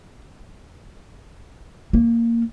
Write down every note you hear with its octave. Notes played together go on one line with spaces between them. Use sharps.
A#3